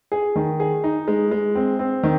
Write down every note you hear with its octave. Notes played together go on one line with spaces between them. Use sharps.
G#4
D#3
G#4
D#4
G#3
G#3
C4
C4
D#3